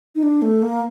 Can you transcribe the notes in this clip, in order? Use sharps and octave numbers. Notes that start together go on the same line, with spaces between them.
D#4
D4
A3
A#3